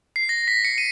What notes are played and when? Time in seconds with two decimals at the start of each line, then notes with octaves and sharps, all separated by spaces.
0.16 C7
0.29 A#6
0.48 B6
0.65 C#7
0.78 D#7